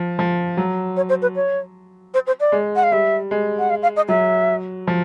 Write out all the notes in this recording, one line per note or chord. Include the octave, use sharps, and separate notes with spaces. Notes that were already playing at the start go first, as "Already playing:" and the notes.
Already playing: F3
F3
F#3
C#5
C5
B4
C#5
C5
C5
D5
G#3
F#5
F5
G3 E5
G#3
F#5
F5
F5
D#5
F#3 E5
F3